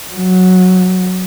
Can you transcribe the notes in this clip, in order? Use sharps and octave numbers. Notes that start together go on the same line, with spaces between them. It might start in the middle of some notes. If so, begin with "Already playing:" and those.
F#3